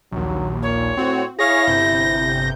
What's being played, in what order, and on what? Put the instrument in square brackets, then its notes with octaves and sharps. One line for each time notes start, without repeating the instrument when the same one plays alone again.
[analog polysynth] A#1 D#2 [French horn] F#3
[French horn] A#2 [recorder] C#5
[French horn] A2 [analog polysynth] C4 F#4
[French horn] E4 [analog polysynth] G#4 C#5 F5 [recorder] A#6
[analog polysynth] G1 C3 G6